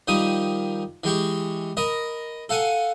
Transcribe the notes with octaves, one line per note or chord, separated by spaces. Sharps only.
D#3 F3 G3 D#6
E3 G#3 G4 C#6
A#4 D#5 B5
A4 F5 F#5 G#5